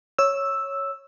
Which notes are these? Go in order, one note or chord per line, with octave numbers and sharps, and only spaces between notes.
C#5 E6